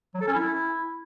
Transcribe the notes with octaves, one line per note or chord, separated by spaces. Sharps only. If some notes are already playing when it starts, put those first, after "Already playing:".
F#3
A4
C#4
E4